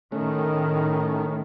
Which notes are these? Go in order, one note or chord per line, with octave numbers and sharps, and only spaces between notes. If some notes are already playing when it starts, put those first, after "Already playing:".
A2 D#3 A3 C#4